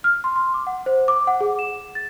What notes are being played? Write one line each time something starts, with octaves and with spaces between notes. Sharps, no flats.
F6
C6
C6
D6
F#5
C5
D6
F#5
G#4
E7
A6